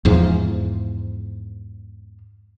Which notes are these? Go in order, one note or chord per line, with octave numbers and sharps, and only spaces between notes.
E2 G#2 F3